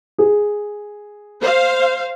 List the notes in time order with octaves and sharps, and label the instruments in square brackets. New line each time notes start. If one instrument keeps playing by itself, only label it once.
[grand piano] G#4
[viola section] C5 F5